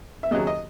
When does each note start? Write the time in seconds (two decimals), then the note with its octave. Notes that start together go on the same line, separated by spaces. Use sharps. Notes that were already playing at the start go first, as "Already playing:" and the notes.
0.23 E5
0.31 D#2 C#3 F#3 D#5
0.47 D#5